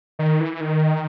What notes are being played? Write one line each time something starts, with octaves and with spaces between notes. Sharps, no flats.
D#3
E3
D#3